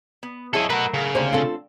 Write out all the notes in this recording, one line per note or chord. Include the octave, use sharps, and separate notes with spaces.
B3
E4 G#4 A4 C#5 D#5
F#3 A3 F#4 A#4 B4
C#3
D2 C3 G3 A#3 C5
C4 F4 A4